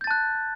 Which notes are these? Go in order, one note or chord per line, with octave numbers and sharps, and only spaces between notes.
A5 F#6 G6 A6